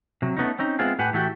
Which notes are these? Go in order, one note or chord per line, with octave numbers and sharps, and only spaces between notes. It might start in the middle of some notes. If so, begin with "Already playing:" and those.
C3 F#3
A3 B3 C#4 D#4
C4 C#4 D#4
G#3 B3 C4 E4 F4 G#4
A2 G4 B4 F#5 G#5
A2 E3 A3 E4 F#4 G4